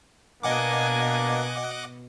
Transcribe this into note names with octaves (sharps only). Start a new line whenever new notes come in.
B2 A#3 D4 D#5 F#5 G#5 D6